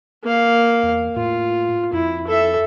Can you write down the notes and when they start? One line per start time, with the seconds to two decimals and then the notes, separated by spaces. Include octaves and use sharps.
0.23 A#3 F5
0.83 E2
1.16 A2 F4
1.93 F2 E4
2.27 A4 E5